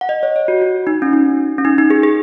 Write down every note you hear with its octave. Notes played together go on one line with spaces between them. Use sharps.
F#5
D#5
C#5
C#5
F#4
F#4
D#4
C#4
D#4
C#4
D#4
D#4
G#4
G#4